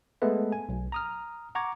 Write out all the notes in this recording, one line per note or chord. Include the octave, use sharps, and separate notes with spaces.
G#3 A3 B3 A4 B4 E5
G#5
B1
A#5 D#6 F6
F#5 A#5 C#6 D6 G#6